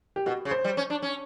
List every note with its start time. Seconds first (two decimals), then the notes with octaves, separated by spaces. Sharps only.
0.16 G4
0.26 B2 F#4
0.45 C#3
0.51 C5
0.64 G3
0.77 C#4
0.90 D4
1.02 C#4